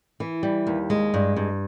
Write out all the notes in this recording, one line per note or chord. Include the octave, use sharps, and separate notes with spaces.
E3
G3
D#2
G#3
G2
G2